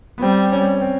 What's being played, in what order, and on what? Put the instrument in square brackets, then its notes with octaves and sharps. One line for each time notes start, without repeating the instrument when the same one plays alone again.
[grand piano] B3
[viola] G3 [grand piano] C4
[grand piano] C#4
C4